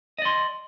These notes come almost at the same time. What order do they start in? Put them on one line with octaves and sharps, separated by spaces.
D#5 D5 C6